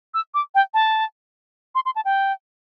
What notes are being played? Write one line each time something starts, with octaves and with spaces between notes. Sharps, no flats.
E6
D6
G5
A5
C6
C6
A5
G5